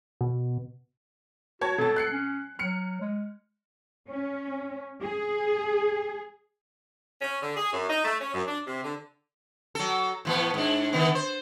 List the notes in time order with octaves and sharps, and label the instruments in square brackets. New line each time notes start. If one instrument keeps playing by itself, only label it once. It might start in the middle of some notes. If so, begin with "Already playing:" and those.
[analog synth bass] B2
[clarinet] F#4 [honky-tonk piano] C#5 A5 G#6
[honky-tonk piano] B2 A5 [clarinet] A4
[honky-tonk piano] F#6 C7 C#7
[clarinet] C#4
[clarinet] F#3 [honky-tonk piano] F6 C#7
[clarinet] G#3
[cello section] C#4
G#4
[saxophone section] C#4
D3
G#4
F#2
D#4
A3
C#4
F#2
D4
C3
D3
[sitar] F#3 A4
A2 E3 B3
G#2 D4
D3 D#3 B3
C5